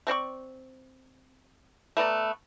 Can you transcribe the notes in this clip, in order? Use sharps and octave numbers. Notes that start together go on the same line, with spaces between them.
A3 C4 D5 C#6
A3 B3 D5 A#5